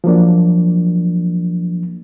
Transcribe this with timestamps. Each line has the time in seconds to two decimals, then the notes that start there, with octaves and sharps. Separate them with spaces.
0.04 F3 F#3 A#3 D4